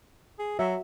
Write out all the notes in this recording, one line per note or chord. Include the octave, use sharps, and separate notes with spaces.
G#4
F#3 F#4 E5